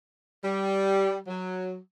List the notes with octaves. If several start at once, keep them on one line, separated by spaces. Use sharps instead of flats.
G3
F#3